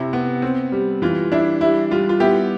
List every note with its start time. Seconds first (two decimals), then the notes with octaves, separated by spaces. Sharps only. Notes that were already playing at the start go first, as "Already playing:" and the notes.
Already playing: C3 E4
0.13 B3
0.42 C4
0.72 G3
1.02 E3 F4
1.32 D4 E4
1.61 G3 E4
1.91 G3 F4
2.09 F4
2.20 B3 E4 G4